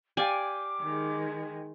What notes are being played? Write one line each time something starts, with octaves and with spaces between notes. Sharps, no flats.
G4 D5 F5 G5 G#5 D6
D#3 G#3